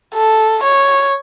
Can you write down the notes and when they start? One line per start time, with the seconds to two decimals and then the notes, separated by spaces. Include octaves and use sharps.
0.15 A4
0.63 C#5